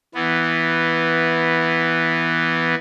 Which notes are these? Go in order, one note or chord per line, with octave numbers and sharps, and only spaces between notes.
E3 B3